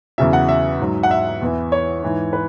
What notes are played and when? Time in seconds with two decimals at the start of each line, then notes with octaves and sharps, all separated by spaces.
0.18 E2 C#3 F#3 E5
0.33 F#5
0.49 E5
0.80 G#2 F#3
1.03 F#5
1.11 E5
1.42 E2 E3
1.72 C#5
2.03 G#2 E3
2.33 B4